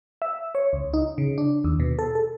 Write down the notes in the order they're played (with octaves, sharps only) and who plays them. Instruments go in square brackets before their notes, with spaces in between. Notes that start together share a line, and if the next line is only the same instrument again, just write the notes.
[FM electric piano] E5
C#5
C#2
D#4
C#3
D4
D#2
B2
A4
A4